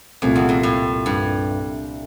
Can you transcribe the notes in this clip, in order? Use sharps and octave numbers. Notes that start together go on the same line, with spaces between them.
C2 F2 A#2 A3 C4
E2
F2
A2
G2